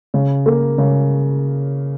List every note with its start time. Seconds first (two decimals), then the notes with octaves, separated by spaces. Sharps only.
0.14 C#3
0.46 A#3
0.78 C#3